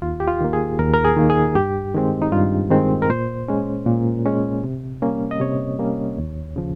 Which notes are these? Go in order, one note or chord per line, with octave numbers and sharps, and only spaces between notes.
D#2 F4
G4
F4
D#3 A#3
G#4
D#2 A#4
A#4
G#4
D#3 A#3
G#4
G2 G4
D#3 G#3 C4
D#4
G2 F4
D#3 G#3 C4
A#4
A#2 C5
G#3 C#4
A#2
G#3 C#4
C3
G3 A#3 C#4
D#5
C3 C#5
G3 A#3 C#4
D#2
C#3 F3